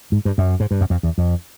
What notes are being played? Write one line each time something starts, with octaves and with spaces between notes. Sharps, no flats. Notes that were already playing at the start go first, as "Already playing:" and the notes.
G#2
G2
F#2
G#2
G2
F#2
F2
E2
F2